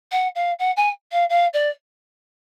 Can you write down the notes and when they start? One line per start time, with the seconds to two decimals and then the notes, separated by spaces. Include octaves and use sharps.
0.12 F#5
0.35 F5
0.59 F#5
0.77 G#5
1.12 F5
1.30 F5
1.53 D5